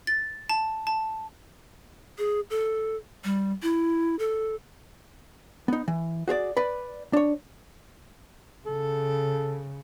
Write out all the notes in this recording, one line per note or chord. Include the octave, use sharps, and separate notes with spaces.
A6
A5
A5
G#4
A4
G3
E4
A4
B3 D#4
E3
F#4 G#4 C#5 D5
B4 D5 B5
D4 C#5
C#3 A4